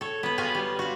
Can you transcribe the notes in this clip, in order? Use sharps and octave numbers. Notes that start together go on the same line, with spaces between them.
A4 C#5
B3 B4
F4 F#4 G#4 B4 F5
G3
F#4 F5